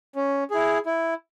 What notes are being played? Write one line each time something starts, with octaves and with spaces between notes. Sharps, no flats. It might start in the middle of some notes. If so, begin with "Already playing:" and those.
C#4
E4 G#4
E4